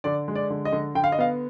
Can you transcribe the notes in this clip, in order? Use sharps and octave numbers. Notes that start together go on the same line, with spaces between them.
D3 D5
G#3
D5
D3
D#5
D3
D3 G5
F5
D#5
B3 F5